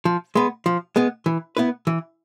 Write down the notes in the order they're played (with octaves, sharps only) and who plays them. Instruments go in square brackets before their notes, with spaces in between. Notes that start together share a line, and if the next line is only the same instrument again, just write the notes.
[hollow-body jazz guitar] F3
G#3 B3
F3
G#3 B3
E3
B3 E4 B4
E3